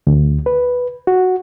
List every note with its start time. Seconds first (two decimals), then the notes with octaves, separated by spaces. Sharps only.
0.07 D2
0.46 B4
1.07 F#4